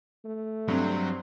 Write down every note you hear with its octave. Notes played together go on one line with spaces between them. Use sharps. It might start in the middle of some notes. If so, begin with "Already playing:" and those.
A3
G2 F#3 C4